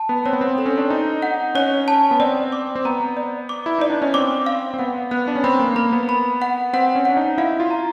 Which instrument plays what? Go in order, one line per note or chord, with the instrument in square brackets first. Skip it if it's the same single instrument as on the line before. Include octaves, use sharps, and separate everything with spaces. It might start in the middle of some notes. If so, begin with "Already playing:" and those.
Already playing: [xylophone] A5
[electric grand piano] B3
[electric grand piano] C4 [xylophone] C#5
[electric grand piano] B3
C4
[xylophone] A4
[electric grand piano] C#4
D4
[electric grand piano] D#4 [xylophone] A4
[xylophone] F#5
[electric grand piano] C#4 [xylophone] C#5
[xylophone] A5
[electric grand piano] B3
[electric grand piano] C4 [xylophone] D5
[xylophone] D6
[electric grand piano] C4
[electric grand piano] B3 [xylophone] A#5
[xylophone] D5
D6
[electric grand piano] E4
[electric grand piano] D#4 [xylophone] D5
[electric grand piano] D4
C#4
[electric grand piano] C4 [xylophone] D6
[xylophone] F5
[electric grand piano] C4
[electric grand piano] B3 [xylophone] F#5
[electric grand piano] B3 [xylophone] F#6
[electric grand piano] D4
C#4
[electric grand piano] C4 [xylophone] B5
[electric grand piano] A#3
[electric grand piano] A#3 [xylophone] B5
[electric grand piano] B3
[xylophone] B5
F#5
[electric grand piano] C4 [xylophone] F#5
[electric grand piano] C#4
[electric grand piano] D4 [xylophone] F#5
[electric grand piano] D#4
[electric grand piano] E4 [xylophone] F5
[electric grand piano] F4
[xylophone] A#5